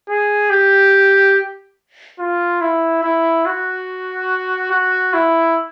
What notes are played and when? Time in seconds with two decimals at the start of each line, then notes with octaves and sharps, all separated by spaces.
0.09 G#4
0.50 G4
2.19 F4
2.61 E4
3.03 E4
3.46 F#4
4.72 F#4
5.14 E4